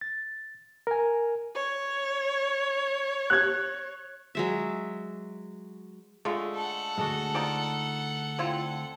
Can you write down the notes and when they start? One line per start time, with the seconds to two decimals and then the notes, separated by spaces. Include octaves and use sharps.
0.01 A6
0.87 A#4 G#5
1.54 C#5
3.30 F#6 G#6
4.35 F#3 G#3 E5
6.25 D3 G#3 A3 F4
6.55 A4 F#5
6.98 D2 G2 G#3 D4 F#4
7.35 D#4 F4 D5 G5 A5
8.39 D3 C4 E4 F4 C5